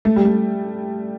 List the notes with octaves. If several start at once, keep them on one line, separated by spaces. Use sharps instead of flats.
A3
G3
A3